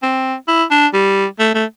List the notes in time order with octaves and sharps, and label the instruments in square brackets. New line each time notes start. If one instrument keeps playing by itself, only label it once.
[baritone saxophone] C4
E4
D4
G3
A3
A3